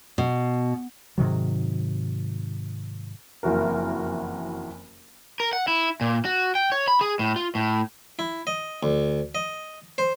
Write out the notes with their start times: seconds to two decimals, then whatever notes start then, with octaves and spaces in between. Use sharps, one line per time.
0.18 B2
1.18 G#2 C3 D#3 F#3
3.43 F#1 F2 E3 F#4 A#4
5.40 A#4
5.53 F#5
5.68 E4
6.01 A#2
6.25 F#4
6.55 G5
6.72 C#5
6.88 B5
7.01 G#4
7.19 A2
7.36 F4
7.55 A2
8.19 E4
8.47 D#5
8.83 D2
9.35 D#5
9.98 C5